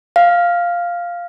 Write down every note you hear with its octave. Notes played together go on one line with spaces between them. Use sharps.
F5